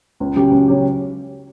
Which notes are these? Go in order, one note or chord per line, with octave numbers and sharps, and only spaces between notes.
C#2
C#3 F#3 C#4 G4
C#2
C#3 F#3 C#4 G4